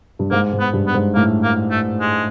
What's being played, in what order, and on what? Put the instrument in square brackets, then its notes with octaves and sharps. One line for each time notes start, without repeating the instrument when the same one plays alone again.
[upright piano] G2
[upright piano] G#2 [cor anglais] A#3
[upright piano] G#2
[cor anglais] B3
[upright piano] G2
[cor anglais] B3
[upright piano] G#2
[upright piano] A2 [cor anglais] A#3
[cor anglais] A#3
A3
G#3